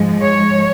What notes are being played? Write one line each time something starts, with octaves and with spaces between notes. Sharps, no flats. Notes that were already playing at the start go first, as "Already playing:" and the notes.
Already playing: G#2 F3 G#3
C#5